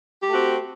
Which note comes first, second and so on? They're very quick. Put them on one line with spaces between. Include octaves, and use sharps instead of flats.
G4 A3 F#4 C4